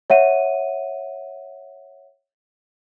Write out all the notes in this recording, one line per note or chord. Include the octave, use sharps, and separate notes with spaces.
C#5 E5 F#5 D#7